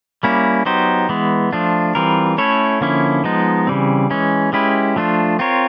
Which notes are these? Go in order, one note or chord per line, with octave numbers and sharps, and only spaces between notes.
G3 A#3 C#4 E4
F#3 B3 D#4 G4 C5
E3 G#3 B3
F3 A3 D4 F4
E3 G3 C4 F4 A#4
A3 C#4 E4 A4 C#5
D3 F3 A#3 C#4 E4
F3 G#3 B3 D#4
C#3 E3 G3 C4
E3 G#3 C#4
G#3 C#4 E4 G4 B4
F3 A3 D4 F4
C4 F4 A#4 C#5